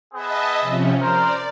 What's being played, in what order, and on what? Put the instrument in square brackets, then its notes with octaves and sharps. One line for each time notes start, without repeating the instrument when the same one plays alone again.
[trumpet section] B3 G#4 [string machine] D#5 E5 A5
[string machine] C3 F3 C#4
[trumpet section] A#4 C5 [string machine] D5